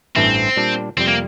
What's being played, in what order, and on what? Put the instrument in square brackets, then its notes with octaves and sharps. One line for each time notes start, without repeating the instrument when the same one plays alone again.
[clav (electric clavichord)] A1 G2 E3 A3 E4 [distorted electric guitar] C4
[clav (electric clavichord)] A#2 G3 D4
[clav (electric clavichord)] F2 C3 G3 [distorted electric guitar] C4
[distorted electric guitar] A#3